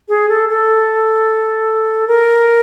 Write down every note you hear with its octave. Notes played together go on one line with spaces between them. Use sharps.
G#4
A4
A4
A#4